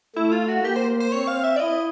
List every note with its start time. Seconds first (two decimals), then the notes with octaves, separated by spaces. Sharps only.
0.16 A3 E4
0.32 F4
0.49 F#4
0.64 A#3 G4
0.76 C5
1.00 C5
1.12 C4 C#5
1.27 F5
1.44 E5
1.56 D5
1.60 E4 D#5